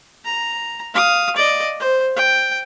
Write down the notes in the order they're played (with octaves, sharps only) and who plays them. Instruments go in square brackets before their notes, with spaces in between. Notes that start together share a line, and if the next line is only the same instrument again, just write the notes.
[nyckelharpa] A#5
F5 D#6
D5 D#5
C5
G5